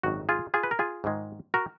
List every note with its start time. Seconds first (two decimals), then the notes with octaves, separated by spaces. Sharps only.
0.03 G#1 F#2 D#3 F#4
0.29 F4 G#4
0.54 F4 G#4
0.63 B4
0.71 A#4
0.79 F4 G#4
1.04 G#2 D#3 G#3
1.54 F#4 A#4